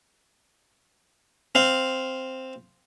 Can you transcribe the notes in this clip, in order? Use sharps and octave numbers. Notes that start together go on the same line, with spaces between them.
C4 F5